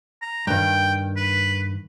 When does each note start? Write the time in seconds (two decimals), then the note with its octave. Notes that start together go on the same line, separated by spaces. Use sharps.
0.22 A#5
0.47 G2 D#3 G5
1.17 B4